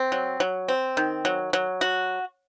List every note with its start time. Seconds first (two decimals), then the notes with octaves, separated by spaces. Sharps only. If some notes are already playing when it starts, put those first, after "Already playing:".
Already playing: C4
0.12 F#3
0.40 F#3
0.68 C4
0.97 D#3
1.25 F#3
1.53 F#3
1.81 F#4